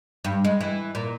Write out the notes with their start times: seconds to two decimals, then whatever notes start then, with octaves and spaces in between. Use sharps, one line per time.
0.25 G2
0.44 G#3
0.61 E3
0.95 A#2